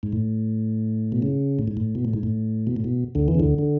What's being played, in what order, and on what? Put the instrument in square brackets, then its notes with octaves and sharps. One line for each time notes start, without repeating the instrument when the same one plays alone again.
[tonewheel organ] G#2
A2
B2
C#3
A2
G#2
A2
B2
A2
G#2
A2
B2
A2
B2
D2 D3
E2 E3
C#3
D2 D3
D3